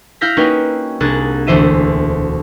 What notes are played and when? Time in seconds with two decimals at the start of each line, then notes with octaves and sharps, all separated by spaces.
0.21 E4 F5 F6 G6 A#6 B6
0.37 A#3 C#4 D#4 F#4 B4 G5
1.00 C2 A#3 D4 G#4 F#6 A6
1.47 E1 D2 E3 C5 E5 D#7